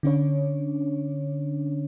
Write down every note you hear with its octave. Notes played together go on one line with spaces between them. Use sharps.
D3 C#4 D4 C#5